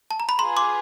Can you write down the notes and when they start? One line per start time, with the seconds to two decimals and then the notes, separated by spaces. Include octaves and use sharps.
0.11 A5
0.20 A#5
0.29 B5
0.39 F4 G#4 B4 A#5 C6
0.57 C6 D6